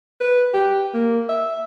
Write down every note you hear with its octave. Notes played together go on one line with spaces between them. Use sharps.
B4
G4
A#3
E5